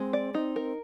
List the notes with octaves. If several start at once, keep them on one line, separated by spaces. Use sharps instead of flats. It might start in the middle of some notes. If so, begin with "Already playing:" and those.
Already playing: G#3 C4
D5
C4 D#4
A#4